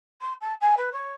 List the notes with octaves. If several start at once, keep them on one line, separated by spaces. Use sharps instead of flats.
C6
A5
G#5
B4
C#5